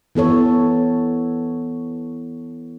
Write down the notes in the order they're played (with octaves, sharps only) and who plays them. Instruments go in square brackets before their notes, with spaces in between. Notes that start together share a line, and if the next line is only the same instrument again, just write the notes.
[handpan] E3 B3 A4 C#5